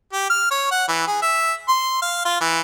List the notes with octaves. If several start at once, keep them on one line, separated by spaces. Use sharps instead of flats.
G4
F6
C#5
F#5
E3
G#4
E5
C6
F5
F4
E3